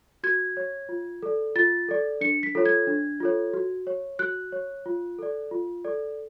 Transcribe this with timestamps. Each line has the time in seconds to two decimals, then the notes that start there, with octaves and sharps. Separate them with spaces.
0.23 F#4 G#6
0.57 C#5
0.89 F4
1.22 A4 D5
1.55 F4 A6
1.89 A4 D5
2.21 D4 C#7
2.43 B6
2.55 F4 A4 C#5
2.66 G#6
2.87 D4
3.20 F4 A4 C#5
3.53 F#4
3.87 C#5
4.19 F#4 F#6
4.52 C#5
4.86 F4
5.19 A4 D5
5.51 F4
5.85 A4 D5